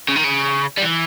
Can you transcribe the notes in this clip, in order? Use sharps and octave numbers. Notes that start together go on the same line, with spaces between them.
C#3
D#3
C#3
G3
E3